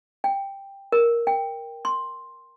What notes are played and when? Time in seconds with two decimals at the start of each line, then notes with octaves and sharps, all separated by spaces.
0.24 G5
0.92 A#4
1.27 G5
1.85 C6